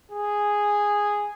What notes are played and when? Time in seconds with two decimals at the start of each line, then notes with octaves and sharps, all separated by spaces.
0.11 G#4